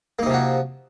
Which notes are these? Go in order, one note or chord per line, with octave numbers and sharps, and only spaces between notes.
C3 F3 A#3 D#4 F#4